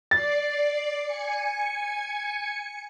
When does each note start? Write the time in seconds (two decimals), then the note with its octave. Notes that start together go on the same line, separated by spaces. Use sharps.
0.11 D5 A6 C7
1.05 G#5 C#7